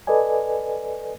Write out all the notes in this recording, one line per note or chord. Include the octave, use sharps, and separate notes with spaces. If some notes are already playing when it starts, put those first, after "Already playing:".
A4 B4 D5 D#5 G#5